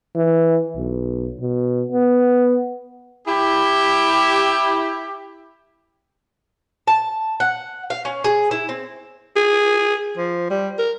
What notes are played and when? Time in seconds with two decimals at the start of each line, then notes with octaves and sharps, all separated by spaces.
0.16 E3
0.76 B1
1.40 B2
1.92 B3
3.28 E4 G4
6.87 A5
7.40 F#5
7.90 F5
8.05 C#4
8.24 G#4
8.51 E4
8.69 C4
9.36 G#4
10.17 F3
10.50 G3
10.79 A#4